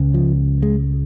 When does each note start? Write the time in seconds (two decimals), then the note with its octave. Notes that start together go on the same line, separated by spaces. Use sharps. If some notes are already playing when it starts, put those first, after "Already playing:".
Already playing: C#2 C#3
0.14 F3
0.63 G#3